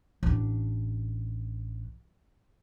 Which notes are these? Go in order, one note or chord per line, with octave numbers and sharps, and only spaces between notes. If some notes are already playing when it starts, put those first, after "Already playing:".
A1 D4